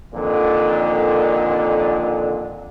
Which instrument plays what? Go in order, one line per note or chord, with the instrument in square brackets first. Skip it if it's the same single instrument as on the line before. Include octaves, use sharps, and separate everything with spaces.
[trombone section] F2 A#2 D3 D#3